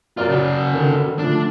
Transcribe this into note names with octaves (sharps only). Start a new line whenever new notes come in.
F#2 F4 A#4 D5 F6
C#3 F#4
D3 D#3 A4
D3 F3 A3 D4